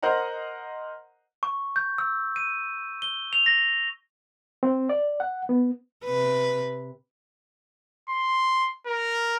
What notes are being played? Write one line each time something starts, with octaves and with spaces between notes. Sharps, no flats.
A#4 C5 D#5 F#5 A#5
C#6
G6
E6
D#7
G7
F7
A#6
C4
D5
F#5
B3
C3 B4
C6
A#4